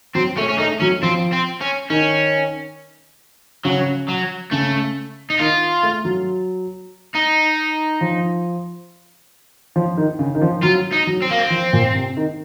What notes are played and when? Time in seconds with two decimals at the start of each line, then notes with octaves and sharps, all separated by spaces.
0.15 F#3 C4
0.38 A3 C#4
0.49 C#4
0.59 A3 D#4
0.81 F#3 C#4
1.02 F3 C4
1.32 C4
1.61 C#4
1.90 D#3 C#4
3.65 C#3 F#3
4.09 F#3
4.52 C#3 A3
5.30 D#4
5.39 D#3 F4
5.83 A3
6.05 F#3
7.15 D#4
8.01 F3
9.76 F3
9.97 D#3
10.19 C#3
10.35 D#3
10.42 F3
10.63 F#3 F4
10.93 D#4
11.07 F#3
11.22 C4
11.31 A#3
11.39 C4
11.50 F3
11.73 A#2
11.94 C3
12.17 D#3